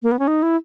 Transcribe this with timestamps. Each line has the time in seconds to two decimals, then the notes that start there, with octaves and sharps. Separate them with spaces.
0.03 A#3
0.12 B3
0.19 C#4
0.28 D#4
0.43 E4